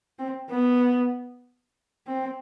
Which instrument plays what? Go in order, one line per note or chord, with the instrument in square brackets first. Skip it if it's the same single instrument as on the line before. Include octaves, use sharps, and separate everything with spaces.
[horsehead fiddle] C4
B3
C4